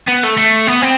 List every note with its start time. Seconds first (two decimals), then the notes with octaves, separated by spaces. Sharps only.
0.08 B3
0.24 A3
0.38 A3
0.68 B3
0.82 C4